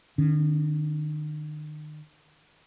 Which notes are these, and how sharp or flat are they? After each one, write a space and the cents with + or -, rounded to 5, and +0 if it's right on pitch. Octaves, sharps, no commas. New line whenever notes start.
D#3 -40 C#4 +5